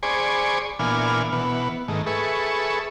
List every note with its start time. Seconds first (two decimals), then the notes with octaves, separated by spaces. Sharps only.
0.03 G#4 C5 D5 G#5 B5 C#6
0.79 A#2 E3 B3 D4 G#5 F6
1.32 B2 E3 B3
1.88 G#2 D#3 A3
2.07 G#4 A4 B4 E5 C#6